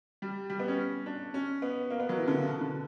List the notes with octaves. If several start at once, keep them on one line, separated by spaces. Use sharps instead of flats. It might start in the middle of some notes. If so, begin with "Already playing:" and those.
G3
G3
B3
C#4
D4
C#4
B3
A#3
B3
F#3
E3
D3
C#3
B2
D3